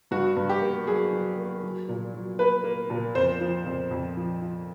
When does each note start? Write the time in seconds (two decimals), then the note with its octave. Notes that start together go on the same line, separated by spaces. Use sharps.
0.11 G2 F#4
0.36 G2
0.49 G4
0.62 A#3
0.87 F#3 G#4
1.13 F#3
1.37 A#3
1.63 F#3
1.88 A#2
2.14 F#3
2.39 A#3 B4
2.64 A#3
2.90 A#2
3.15 F2 C5
3.41 F3
3.66 F2
3.91 F2
4.17 F3
4.42 F3